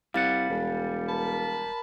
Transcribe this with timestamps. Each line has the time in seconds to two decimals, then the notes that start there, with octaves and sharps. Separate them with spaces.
0.14 C2 G3 F5 F#5 A6
0.50 E1
1.08 A#4 A5 B5